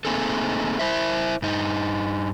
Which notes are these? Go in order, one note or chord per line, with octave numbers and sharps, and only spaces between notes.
A3 A#3 C4 D#4 G#4 A4
E4 C5 E5
G2 D#4